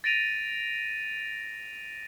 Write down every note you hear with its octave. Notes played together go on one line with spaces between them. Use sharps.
A6 A#6 D7 D#7 F7